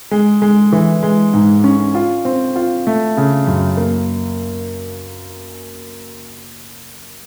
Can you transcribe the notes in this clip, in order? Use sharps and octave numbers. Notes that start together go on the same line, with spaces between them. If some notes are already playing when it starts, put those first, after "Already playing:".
G#3
G#3
E3
G#3
G#2
C#4
F4
C4
F4
A3
C#3
F#2
A#3